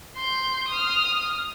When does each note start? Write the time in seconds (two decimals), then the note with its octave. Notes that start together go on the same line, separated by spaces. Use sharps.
0.16 C6 G6
0.69 D#6 F6